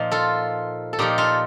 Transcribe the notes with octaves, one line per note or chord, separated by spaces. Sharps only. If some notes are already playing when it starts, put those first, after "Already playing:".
Already playing: A#2 F3 D#4
F4 A4
A4
A#2 F3 D#4 G4
F4 A4